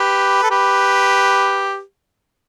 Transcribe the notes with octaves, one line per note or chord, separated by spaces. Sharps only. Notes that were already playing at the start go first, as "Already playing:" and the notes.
Already playing: G4 B4
A4
G4 B4